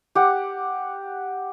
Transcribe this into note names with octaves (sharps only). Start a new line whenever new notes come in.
G4 F#5